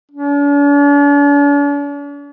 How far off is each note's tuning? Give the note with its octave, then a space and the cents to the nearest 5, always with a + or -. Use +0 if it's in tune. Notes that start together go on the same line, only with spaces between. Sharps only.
D4 -45